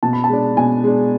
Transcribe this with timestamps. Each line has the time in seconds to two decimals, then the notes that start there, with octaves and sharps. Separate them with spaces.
0.03 B2 A5
0.13 B5
0.24 A5
0.29 G#3 D4
0.57 B2 G#5
0.84 G#3 D4